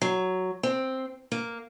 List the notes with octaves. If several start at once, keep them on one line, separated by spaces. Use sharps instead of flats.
F#3
C4
A#3